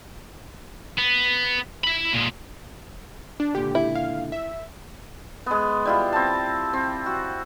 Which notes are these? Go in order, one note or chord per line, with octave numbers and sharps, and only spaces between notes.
B3
E5 B5
A#2 G#3
D4
C#2 A#2 D3 G4
E4
F5
E5
G#3 B3
G3 E4 F4
C4 A5
C4
F#4